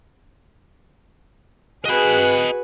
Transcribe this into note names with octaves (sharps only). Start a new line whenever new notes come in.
F#4 G#4 B4 D#5 B5 F#6